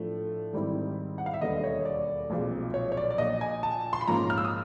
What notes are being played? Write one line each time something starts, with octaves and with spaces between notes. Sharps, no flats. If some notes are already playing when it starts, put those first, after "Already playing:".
Already playing: A2 F3 A3 D4
G#2 D#3 G3 C4 E4
F#5
F5
E5
E1 D#2 D3 G3 B3 D#5
C#5
D5
B1 A#2 F3 G#3 C4
C#5
C#5
D5
D5
A#1 A#2 F3 D#5
G#5
A5
C6
B5
G#2 F3 A#3 C#4 F4 A#5
F6
E6
D#6